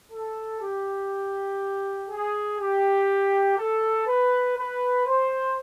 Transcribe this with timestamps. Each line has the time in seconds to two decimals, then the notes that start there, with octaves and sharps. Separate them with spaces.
0.12 A4
0.61 G4
2.10 G#4
2.59 G4
3.58 A4
4.07 B4
4.57 B4
5.06 C5